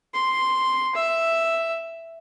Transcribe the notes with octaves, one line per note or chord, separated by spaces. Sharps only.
C6
E5